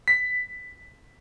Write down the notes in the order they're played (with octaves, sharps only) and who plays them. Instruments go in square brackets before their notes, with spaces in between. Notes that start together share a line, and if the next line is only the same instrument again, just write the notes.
[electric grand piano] B6